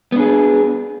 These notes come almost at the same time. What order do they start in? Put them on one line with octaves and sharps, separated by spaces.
B3 D4 G#4